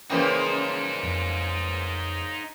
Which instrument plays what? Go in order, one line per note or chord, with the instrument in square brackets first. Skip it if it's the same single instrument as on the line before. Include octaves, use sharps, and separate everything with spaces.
[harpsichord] A#2 E3 G5 [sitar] C#3 F3 A#3 [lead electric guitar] D#4 C5
[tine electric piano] F2